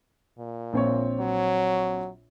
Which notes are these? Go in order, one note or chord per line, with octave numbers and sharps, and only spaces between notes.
A#2
A#1 C4 C#5
F#3